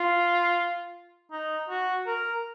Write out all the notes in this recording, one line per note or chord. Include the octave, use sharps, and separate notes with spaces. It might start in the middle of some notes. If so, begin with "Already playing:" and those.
Already playing: F4
D#4
F#4
A#4